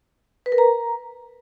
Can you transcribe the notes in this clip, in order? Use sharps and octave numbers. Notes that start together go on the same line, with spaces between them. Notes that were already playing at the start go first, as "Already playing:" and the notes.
B4
A#4
A#5